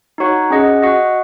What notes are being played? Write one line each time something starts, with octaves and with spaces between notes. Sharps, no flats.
D#4 F#4 C#5 F#5
C#4 G#4 D#5 F#5
F#4 D#5 F#5